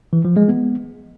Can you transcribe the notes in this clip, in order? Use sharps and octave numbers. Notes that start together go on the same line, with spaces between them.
E3
F3
G#3
B3